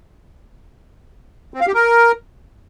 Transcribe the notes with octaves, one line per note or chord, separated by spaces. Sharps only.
C4
F5
G4
A#4